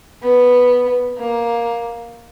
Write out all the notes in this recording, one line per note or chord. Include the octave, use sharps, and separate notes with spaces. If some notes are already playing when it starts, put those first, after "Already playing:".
B3
A#3